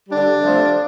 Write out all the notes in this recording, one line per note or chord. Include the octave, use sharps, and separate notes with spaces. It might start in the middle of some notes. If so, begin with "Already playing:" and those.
D3 G3 D4
C3 F3 A3